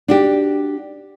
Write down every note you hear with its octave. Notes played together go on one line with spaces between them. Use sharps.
D4 F#4 G4